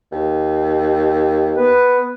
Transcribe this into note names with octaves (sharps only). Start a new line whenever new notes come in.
D#2
B3 B4